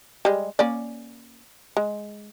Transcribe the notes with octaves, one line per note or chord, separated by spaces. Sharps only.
G3 G#3
A#3 C#4 D5
G#3